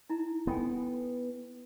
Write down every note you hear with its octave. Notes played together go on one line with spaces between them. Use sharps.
D#4 E4 A#5
B3 A4 G5 G#5